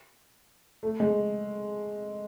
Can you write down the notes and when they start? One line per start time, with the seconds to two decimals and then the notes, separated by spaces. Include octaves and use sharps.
0.83 A3
1.00 G#3